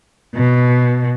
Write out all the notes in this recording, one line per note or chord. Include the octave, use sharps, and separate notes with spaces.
B2